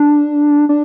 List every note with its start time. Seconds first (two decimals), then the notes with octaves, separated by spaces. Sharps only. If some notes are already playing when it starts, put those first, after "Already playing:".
Already playing: D4
0.69 D4